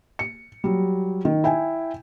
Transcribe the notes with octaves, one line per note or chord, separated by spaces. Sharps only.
C#7
F#3 G3
D#3
E4 G5 G#5